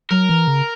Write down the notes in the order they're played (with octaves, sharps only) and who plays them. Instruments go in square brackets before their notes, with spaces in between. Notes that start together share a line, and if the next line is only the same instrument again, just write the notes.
[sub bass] F#3 [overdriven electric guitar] A#4
[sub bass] E3
C#3